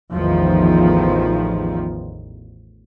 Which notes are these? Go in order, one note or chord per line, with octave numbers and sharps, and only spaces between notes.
A1 E2 D#3 F3